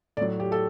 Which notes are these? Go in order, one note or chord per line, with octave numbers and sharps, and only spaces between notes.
A2 F#3 D5
G4
A4